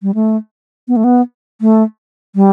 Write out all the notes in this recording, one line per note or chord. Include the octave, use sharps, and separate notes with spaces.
G3
A3
B3
A3
B3
A3
G3